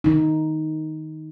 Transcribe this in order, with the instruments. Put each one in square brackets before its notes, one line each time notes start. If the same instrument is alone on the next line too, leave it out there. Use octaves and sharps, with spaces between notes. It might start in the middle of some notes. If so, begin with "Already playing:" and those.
[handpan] D#3 D#4